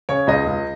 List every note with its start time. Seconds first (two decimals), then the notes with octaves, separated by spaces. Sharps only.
0.09 C#3 C#5
0.27 C#2 D#5
0.47 C#2